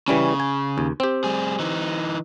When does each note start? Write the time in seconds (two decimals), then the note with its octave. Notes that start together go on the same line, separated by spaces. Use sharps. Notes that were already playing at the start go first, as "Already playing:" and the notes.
0.08 C#3 E3 G3 C#4
0.40 G#5
0.78 D#2
1.00 C4 G4
1.24 G3 G#4
1.59 E3 D#4